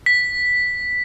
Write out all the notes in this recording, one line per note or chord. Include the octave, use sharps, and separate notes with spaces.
B6